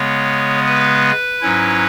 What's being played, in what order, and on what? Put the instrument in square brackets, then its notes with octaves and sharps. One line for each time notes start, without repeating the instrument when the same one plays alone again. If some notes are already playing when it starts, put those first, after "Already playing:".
Already playing: [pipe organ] C#3 G#3 B3 C#5
B4
G#2 F#3 C#4 E4